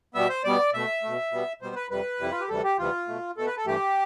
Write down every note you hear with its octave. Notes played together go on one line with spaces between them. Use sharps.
B2 G3 B3 E5
C5
B2 G3 B3 D5
B2 A3 E5
B2 A3
B2 G3 B3
B2 G3 B3 C5
B4
F2 C3 G3 B4
F2 C3 G3 E4
F4
G4
D2 C3 E3 G3 B3 A4
G4
D2 C3 E3 G3 B3 F4
B2 A3
B2 A3 A4
B4
A4
G2 E3 A3 G4